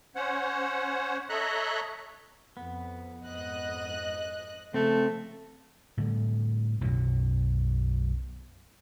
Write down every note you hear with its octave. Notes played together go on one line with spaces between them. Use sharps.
C#4 C5 C#5 F#5
A4 C#5 D#5 E5 A#5 F#6
F2 B3
F2 G#2 D#5 F#6
C#3 F3 G#3 A3 C4 A5
A2 D3 G3
B1 F#2 B2 F#3